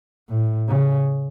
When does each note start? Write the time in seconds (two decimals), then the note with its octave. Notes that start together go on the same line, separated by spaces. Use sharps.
0.30 A2
0.69 C#3